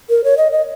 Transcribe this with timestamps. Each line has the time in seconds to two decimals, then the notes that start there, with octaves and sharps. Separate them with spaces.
0.10 A#4
0.24 C#5
0.37 D#5
0.52 D#5